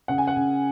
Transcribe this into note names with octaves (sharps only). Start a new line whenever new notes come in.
C#3 F#5
G#5
F#5
C#3